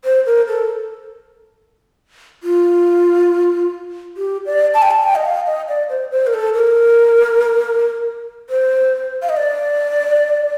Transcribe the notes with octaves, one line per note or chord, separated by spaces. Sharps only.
C5
A#4
A4
F4
G4
D5
A5
G5
A5
G5
D#5
F5
D#5
D5
C5
C5
A#4
A4
A#4
C5
F5
D#5
D5